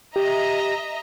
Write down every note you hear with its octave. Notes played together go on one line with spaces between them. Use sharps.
G4 D#5 E5 A#5